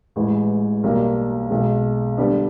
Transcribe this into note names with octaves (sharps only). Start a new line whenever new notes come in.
A1 G#2 E3 G#3
B1 B2 G3 A#3
B1 B2 G#3
D3 G3 B3 D4 G4